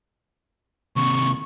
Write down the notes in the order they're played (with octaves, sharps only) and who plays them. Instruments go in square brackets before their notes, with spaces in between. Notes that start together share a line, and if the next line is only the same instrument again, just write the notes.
[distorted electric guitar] D#2 C3 [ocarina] C#6